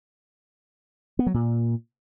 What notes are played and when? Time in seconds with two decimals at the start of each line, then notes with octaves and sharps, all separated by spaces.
1.19 B3
1.27 F#3
1.34 A#2